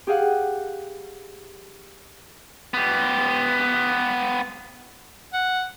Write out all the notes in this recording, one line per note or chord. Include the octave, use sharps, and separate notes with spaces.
G4 G#4 F5 F#5
B3 G4
F#5